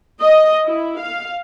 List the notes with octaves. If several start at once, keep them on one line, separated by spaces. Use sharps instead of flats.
D#5
E4
F5